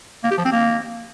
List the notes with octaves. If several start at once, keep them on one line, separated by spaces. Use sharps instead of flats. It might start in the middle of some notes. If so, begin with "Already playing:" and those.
A#3
G4
F3
C4
A#3